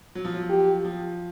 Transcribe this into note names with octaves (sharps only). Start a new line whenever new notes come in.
F#3
F3
F#3
G4
F3